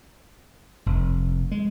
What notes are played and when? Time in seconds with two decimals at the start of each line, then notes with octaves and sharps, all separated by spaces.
0.86 F1
1.51 G#3